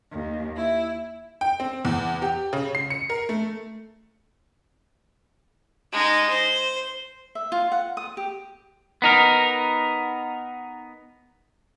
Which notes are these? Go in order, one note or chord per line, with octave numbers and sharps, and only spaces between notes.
D#2
E4
G5
C4
E2
G4
C#3
C7
C#7
A#4
A3
G#3 D#4
C5
E5
F4
F#5
D#6
G4
B3 D#4 A#4